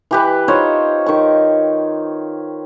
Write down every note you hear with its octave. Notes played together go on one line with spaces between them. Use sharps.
E3 G4 B4
D#4 F4 C5 C#5
D#3 C#6